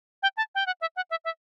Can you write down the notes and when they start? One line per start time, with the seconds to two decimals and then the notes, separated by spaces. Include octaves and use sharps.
0.23 G5
0.37 A5
0.55 G5
0.66 F#5
0.81 E5
0.96 F#5
1.11 E5
1.25 E5